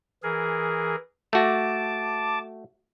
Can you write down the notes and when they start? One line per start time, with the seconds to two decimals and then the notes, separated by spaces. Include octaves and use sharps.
0.23 E3 G#4 A#4
1.33 A3 F#4 A5 D6